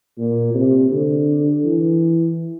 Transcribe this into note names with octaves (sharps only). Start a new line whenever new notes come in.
A#2
C3
D3
E3